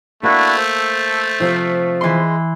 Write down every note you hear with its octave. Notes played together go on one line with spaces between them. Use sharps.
A3 A#3 D4 E4 F#4
A4 C5
C3 F3
E3 G#3 C6